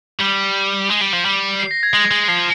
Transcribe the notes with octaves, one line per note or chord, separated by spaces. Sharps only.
G3 G6
G#3
G3
F3
G3
C7
A#6
G#6
G#3 A#6
G#3
F3 C7